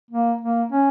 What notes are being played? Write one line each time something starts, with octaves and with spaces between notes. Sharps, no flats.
A#3
A#3
C#4